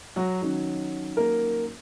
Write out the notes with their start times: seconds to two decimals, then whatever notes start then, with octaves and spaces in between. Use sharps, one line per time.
0.16 F#3 F#4
0.41 D#3 F#3 C#4
1.17 A#3 A#4